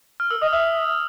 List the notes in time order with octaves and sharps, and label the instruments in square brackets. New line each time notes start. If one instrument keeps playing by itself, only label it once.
[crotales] F6
[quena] A#4 [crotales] E6
[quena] D#5 [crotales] D#6
[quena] E5 [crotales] E6